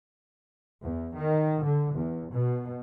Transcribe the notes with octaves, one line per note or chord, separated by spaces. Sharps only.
E2
D#3
D3
E2
B2